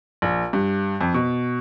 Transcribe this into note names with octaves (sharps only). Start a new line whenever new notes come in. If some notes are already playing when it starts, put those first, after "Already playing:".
A#1
G2
F2
B2